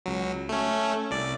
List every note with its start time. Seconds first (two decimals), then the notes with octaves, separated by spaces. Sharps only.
0.06 C#2 F#3
0.49 A3 C#4
1.11 C2 D5